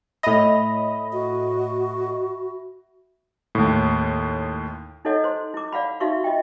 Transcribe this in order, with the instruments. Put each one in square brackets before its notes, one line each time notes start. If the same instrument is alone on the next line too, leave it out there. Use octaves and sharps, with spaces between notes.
[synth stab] A2 D#5 [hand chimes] E5 B5 A#6
[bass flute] F#4
[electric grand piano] D#2 A2
[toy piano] D#4 E4 A4 C#5 D#5 F#5
C5 C6
E4 D6
D5 F5 F#5 B5
D#4 F#4 E5 F5 C6 C#6
F4 D#5 E5 G5